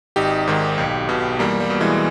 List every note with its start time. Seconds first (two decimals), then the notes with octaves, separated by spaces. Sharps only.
0.16 G#1 D#4 G4
0.47 G#2 D#3
0.78 B1
1.09 B2
1.39 E2 G3 A#3
1.60 G3
1.70 B2
1.80 E3 G#3